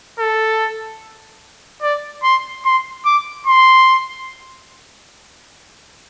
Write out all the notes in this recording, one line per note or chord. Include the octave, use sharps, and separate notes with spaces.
A4
D5
C6
C6
D6
C6